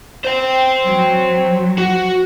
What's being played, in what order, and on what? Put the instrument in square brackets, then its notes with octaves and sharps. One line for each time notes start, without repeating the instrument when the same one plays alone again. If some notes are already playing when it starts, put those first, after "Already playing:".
[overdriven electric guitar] C5 G5
[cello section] F#3
[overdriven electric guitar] F#4